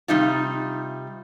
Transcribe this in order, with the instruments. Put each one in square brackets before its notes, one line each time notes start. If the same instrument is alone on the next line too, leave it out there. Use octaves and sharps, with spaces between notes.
[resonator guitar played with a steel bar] C3 G3 D#4 F4